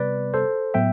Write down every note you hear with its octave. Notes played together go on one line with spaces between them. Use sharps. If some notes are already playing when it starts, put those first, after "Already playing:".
Already playing: C3 G3 B3 B4 D5
A4 C5
A2 F#3 B3 E5 G5